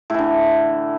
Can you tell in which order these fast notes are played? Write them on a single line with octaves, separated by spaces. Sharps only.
A2 E3 D3